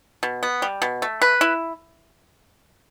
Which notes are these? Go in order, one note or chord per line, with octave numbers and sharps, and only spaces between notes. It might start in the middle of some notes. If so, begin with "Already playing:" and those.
B2
B3
G3
B2
A3
B4
E4